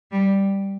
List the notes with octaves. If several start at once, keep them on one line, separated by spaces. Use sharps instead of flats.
G3